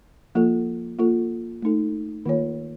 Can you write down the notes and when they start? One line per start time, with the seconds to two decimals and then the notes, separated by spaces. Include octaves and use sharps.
0.35 F3 A#3 F4 A4
0.99 A#3 F4 A4
1.62 A3 D#4 A4
2.26 D#3 A#3 F4 A4 C#5